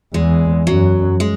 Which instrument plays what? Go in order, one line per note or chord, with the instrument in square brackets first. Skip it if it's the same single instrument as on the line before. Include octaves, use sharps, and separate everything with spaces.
[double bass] E2 [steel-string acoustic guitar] G#3
[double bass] F#2 [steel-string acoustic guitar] F#3
[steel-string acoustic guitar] G#3